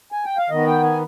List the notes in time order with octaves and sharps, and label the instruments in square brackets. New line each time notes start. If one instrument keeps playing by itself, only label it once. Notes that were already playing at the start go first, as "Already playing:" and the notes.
[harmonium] G#5
G5
F5
D#3 B3 D#5
G5
G#5